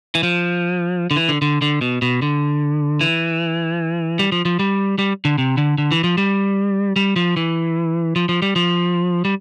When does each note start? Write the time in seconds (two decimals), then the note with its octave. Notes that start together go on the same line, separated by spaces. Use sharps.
0.15 E3
0.23 F3
1.11 D3
1.16 E3
1.29 D3
1.42 D3
1.62 D3
1.81 B2
2.02 B2
2.22 D3
3.01 E3
4.19 G3
4.32 F3
4.45 F3
4.59 G3
4.99 G3
5.25 D3
5.38 C3
5.57 D3
5.78 D3
5.91 E3
6.04 F3
6.18 G3
6.96 G3
7.16 F3
7.37 E3
8.16 F3
8.29 F3
8.42 G3
8.56 F3
9.25 G3